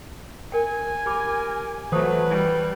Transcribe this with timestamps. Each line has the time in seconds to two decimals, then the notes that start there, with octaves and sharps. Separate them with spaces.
0.52 A#4 G5 G#5
1.06 G4 A#4 B5 D6
1.92 E3 F#3 A3 B4 C5 F#5 D#6
2.30 G3